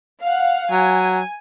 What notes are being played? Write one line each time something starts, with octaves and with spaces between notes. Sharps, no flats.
F5 F#5
F#3 G#5